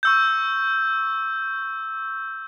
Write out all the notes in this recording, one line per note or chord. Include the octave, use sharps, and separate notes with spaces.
C#6 E6 G6